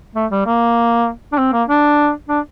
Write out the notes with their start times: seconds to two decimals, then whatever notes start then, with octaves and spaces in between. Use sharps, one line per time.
0.15 A3
0.31 G3
0.46 A#3
1.32 D4
1.38 C4
1.52 A#3
1.68 D4
2.29 D4